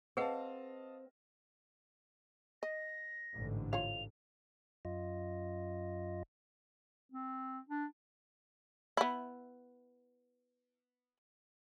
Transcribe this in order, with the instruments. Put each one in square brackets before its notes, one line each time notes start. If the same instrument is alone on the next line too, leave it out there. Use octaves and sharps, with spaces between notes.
[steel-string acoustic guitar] C4 [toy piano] G#4 B4 F#5 [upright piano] D#5 F5 A5
[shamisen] D#5 [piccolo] A#6
[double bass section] A1 G#2 D3
[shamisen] F4 C#5 F5 [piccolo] F7
[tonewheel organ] F#2 F4 D#5
[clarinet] C4
D4
[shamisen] B3 E4